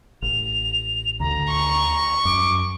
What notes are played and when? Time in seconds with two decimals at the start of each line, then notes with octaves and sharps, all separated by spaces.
0.22 A1 F7
1.20 D2 D3 A#5
1.50 C#6
2.25 F#2 D6